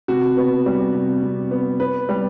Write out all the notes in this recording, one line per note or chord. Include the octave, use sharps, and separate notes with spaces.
C3 F#4
B3
G3
C3
C3
B3
B3 B4
G3